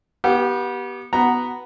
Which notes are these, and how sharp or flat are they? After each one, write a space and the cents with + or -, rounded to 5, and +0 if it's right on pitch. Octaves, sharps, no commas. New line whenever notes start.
B3 -30 G4 -10
B3 +0 F#4 +10 A#5 +0